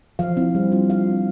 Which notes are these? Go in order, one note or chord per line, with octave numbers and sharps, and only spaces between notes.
F3 F5
C4 E4
G3
D4 F4
G3 F5
C4 F4